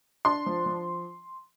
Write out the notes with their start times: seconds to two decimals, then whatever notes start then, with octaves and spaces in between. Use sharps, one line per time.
0.25 D4 C6
0.46 F3
0.66 F3